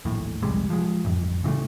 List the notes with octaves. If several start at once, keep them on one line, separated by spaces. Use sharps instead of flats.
D#1 A#1 A2
C2 F2 G3 G#3
F3 G#3
A1 F2
C#3 E3 F#3 A3